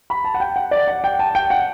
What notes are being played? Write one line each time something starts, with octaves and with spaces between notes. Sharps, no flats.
B5
A5
F#5
G5
F#5
D5
F#5
G5
A5
G5
F#5